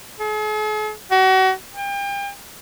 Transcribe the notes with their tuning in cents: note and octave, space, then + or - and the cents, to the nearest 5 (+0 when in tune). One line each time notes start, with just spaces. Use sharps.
G#4 +45
F#4 +35
G5 +35